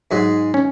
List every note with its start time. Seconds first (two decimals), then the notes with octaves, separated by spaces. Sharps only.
0.11 G#2 F#3 G#3
0.54 C#4